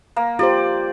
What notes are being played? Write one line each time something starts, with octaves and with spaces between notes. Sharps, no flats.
A#3
F4 G4 C5 D5